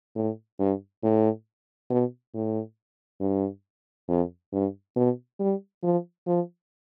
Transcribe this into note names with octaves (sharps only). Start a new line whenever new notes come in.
A2
G2
A2
B2
A2
G2
F2
G2
B2
G3
F3
F3